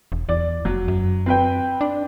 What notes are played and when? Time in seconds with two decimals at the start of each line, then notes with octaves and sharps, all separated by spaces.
0.12 E1
0.29 E2 D5
0.65 F1 F#3
0.88 F#2
1.26 C4 B4 G5
1.81 D4